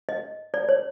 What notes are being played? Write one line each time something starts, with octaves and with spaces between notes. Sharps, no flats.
D#5
D5
C#5